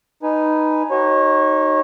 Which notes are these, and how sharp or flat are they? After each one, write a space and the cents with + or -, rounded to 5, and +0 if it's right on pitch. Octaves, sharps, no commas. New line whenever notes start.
D#4 -5 B4 -10 G#5 +0
D#4 +0 F#4 +35 C#5 -30